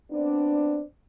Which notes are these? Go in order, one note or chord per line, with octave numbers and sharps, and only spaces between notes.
B3 C4 D4